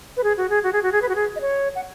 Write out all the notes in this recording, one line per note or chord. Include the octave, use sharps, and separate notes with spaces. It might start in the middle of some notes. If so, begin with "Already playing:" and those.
B4
G#4
F#4
G#4
F#4
G#4
F#4
G#4
B4
F#4
G#4
D#5
C#5
F#5